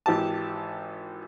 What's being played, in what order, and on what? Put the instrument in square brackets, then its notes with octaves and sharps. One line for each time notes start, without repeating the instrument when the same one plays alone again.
[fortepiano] G#1 E3 G4 A5